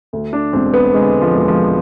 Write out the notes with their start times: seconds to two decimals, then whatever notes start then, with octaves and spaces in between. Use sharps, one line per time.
0.13 D2
0.33 D4
0.53 E1 C4
0.74 B3
0.94 D3 G#3
1.22 F3
1.35 E1
1.48 F3